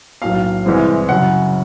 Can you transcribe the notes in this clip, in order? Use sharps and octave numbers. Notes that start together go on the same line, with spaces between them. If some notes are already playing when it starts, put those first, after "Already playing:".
B1 A2 F#3 A#3 F5
C2 C3 E3 G#3 C4
F#2 C#3 F#3 F#5